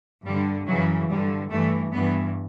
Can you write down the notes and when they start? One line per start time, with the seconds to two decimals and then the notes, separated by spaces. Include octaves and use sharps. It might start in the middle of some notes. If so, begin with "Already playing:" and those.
0.24 G2 D3 G3
0.66 F#2 C#3 E3 F#3
1.09 G2 D3 G3
1.50 G2 E3 A3
1.92 G2 E3 B3